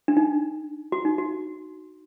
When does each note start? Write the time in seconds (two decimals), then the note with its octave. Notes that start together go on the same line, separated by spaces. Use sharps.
0.08 D4
0.17 D#4
0.92 F#4
1.05 D#4
1.18 F#4